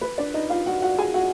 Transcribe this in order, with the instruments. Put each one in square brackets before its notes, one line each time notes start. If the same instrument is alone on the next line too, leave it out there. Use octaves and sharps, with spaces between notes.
[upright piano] B4
D4 D5
D#4 D#5
F4 F5
F#4 F#5
F#4 F#5
G#4 G#5
F#4 F#5